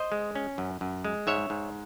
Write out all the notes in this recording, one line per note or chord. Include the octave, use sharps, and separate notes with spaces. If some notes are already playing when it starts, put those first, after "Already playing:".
Already playing: C5 D#5
G#3
C#4
F#2
F#2
G#3
G#2 C#5 E5
G#2